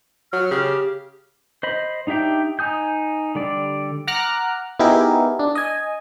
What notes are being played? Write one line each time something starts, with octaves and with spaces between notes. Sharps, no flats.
F#3 F6
C#3 G4
C5 D#5 B5
D4 D#4 G4 E5 G5
D#4 G#5 D#6 G6
D3 G3 D5
F#5 A#5 D6 F6 F#6
B3 D#4 E4 G4 G#4 A#4
D4
D#5 G#5